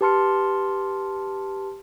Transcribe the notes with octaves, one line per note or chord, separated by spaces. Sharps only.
G4 B4 A5 C6 F6 C#7